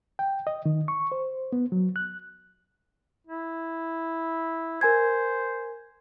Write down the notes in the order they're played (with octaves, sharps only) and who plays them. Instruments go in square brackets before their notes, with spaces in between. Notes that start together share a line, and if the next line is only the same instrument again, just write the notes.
[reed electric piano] G5
D#5
D#3
C#6
C5
B3
F#3
F#6
[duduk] E4
[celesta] A#4 G#5 G#6 [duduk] C5